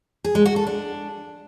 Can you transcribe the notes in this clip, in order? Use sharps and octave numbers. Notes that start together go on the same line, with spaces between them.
G#4
G#3
F#4
A4
D4